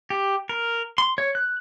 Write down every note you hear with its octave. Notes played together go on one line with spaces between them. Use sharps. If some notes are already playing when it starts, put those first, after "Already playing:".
G4
A#4
C6
C#5
F#6